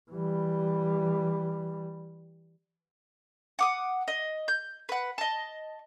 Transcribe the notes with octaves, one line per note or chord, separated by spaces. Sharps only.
E3 G3
F#5 D6 D#6
D#5
G6
B4 F#5
D#5 A5